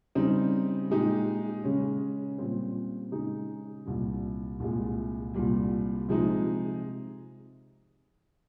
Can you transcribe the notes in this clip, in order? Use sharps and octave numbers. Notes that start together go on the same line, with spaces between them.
C#3 G3 C4 D#4
A#2 G#3 D#4 G4
C#3 G#3 C#4
A#2 G3 C4
C#3 G#3 D#4
C2 A#2 G3
C2 A#2 G#3
C2 A#2 G3
C3 F3 G#3 D#4